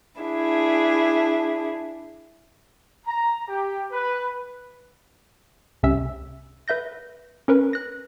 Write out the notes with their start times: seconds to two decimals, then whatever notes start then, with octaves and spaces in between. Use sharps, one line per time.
0.20 D4 E4 G#4
3.06 A#5
3.48 G4
3.91 B4
5.83 C2 C3 C#4 E5 E6
6.68 B4 E5 G6 A#6
7.48 C#4 A#4 B4
7.73 F#6 A#6